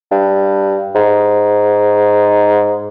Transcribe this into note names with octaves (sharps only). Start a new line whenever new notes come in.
G2
G#2